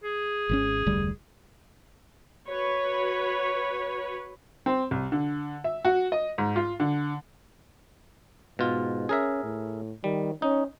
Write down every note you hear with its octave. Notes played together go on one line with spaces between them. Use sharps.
G#4
G#1 D#3 C#4
F1 D2 G3
F#4 B4 C#5
C4
C2
D3
E5
F#4
D#5
G#2
F4
D3
G#2 B2 F4
C#4 G#4 A#4 E5
A2
D#3 G3
C#4 D#4